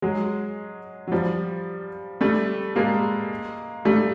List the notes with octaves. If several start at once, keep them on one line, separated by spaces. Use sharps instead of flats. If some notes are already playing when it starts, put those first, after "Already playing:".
F#3 G#3
F#3
F3 G3
G3 A3
G#3 A#3
G3 A3